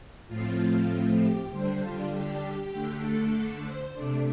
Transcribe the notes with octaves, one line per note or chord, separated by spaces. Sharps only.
A2 F3 A3 C4 F4
G4
D3 G3 D4 C5
F4
G4
D3 A3 D4
A4
C5
C3 A3 D4 D5